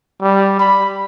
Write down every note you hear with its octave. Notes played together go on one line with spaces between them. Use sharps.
G3
B5